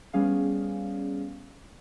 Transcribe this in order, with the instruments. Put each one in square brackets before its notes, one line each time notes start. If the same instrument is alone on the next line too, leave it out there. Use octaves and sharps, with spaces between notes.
[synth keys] G3 B3 C#4 G#4 F5